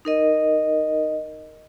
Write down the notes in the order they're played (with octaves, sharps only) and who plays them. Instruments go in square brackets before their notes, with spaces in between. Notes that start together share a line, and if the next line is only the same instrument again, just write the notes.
[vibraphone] D#4 A#4 D#5